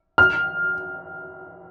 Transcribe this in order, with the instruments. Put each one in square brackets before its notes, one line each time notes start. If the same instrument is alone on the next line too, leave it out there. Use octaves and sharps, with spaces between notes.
[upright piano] F6